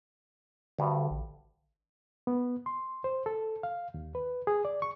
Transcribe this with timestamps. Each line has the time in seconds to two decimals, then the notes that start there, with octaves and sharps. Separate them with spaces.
0.78 D2 G2 D3
1.11 A1
2.27 B3
2.66 C6
3.04 C5
3.26 A4
3.63 F5
3.94 D#2
4.15 B4
4.47 G#4
4.65 D5
4.82 C#6